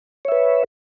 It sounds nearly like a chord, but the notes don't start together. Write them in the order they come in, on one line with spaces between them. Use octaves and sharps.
C#5 E5 B4